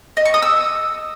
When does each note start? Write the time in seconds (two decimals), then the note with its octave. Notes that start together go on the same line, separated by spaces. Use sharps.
0.17 D#5
0.25 C#6
0.34 D#6
0.42 E6